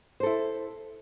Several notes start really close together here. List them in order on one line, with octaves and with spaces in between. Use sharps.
C5 A4 E4